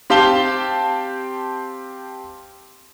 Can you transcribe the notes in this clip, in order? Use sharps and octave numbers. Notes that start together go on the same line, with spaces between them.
C4 G4 F5 A5 G7